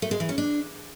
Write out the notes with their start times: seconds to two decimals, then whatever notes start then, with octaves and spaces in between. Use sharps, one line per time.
0.02 A3
0.11 G#3
0.20 E3
0.29 C#4
0.38 D4